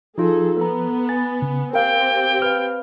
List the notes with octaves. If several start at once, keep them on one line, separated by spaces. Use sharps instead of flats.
F3 D#4 F4 G#4 A4
B3 A4 A#5
G#5 A6
C#3
C4 G4 A#4 F5 G5
B4 F5 F6